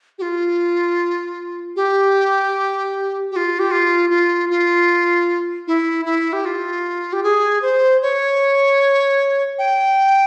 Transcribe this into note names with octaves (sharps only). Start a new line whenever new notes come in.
G4
F4
G4
G4
F4
G4
F4
F4
F4
E4
E4
G4
F4
G4
G#4
C5
C#5
G5